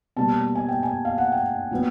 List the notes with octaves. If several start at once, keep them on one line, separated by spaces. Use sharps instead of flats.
B2 G3 A#3 A5
G#5
G5
G#5
F5
F#5
G5
A#2 F#3 B3